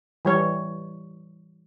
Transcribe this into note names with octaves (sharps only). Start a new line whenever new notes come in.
E3 G3 C#5